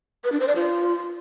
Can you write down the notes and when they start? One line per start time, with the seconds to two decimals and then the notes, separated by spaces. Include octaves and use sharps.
0.24 B4
0.32 D4
0.40 C5
0.48 D5
0.56 F4